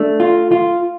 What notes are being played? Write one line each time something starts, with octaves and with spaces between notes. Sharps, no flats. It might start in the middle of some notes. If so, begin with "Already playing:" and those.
Already playing: A3 D4
F4
F4